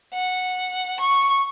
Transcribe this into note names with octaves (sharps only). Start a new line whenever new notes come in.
F#5
C#6